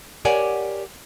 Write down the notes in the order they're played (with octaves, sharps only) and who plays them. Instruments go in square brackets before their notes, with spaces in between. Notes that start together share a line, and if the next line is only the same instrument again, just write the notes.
[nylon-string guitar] G4 A#4 C#5 D5 F#5 G#5